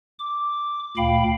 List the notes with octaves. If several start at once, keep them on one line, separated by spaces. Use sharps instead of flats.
D6
D2 A#2 F5 G5 B5